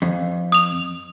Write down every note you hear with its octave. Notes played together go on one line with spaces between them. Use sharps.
F2
D#6 F7